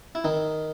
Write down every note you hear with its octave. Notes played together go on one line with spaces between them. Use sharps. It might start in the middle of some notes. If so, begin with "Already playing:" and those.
E4
D#3 D#4